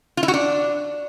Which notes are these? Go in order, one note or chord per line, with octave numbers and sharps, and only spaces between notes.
F4
E4
F#4
D4